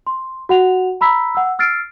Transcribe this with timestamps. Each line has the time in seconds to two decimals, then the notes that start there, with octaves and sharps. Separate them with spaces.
0.07 C6
0.49 F#4 F#5 F7
1.01 A#5 B5 E6 B6
1.35 F#5 E6
1.59 E6 F6 A6 C7 D7